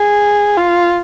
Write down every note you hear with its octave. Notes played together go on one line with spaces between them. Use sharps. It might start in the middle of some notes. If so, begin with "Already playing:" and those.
Already playing: G#4
F4